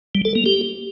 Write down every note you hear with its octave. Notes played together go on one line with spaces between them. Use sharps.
G3
A4
A#3
G4